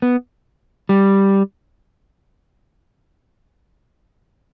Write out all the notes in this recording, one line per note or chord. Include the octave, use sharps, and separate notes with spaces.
B3
G3